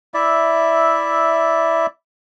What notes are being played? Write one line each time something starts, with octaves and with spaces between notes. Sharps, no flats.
E4 D5 E5